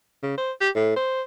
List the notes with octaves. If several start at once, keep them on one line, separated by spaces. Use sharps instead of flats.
C#3
C5
G4
A2
C5